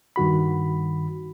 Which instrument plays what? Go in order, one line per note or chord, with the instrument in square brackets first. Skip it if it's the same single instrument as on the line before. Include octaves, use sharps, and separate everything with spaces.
[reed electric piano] G2 D#3 F#4 B5